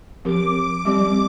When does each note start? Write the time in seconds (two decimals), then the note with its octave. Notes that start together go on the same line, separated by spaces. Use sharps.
0.25 F3 C4 G4 A#4 D6
0.85 G3 C4 G4 D5